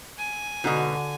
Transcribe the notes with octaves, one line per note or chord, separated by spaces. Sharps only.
G#5
G#2 B2 D3 D4 F#4